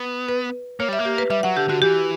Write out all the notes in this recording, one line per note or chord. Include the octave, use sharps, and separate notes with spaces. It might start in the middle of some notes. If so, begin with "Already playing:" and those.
Already playing: B3
B4
A#3 C#5
G3 E5
A#3
G4
B4
G3 E5
F#3 F#5
D3 G4
D3 F#4
E3 G4